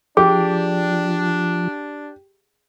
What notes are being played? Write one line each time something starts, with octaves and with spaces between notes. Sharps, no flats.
F3 D4 G4 G#4